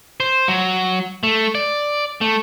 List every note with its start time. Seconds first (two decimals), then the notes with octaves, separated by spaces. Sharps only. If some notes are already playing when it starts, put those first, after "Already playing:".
0.20 C5
0.48 F#3
1.23 A3
1.55 D5
2.21 A3